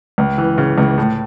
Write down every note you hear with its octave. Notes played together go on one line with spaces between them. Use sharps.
C#2
E3
C#3
C#2
A2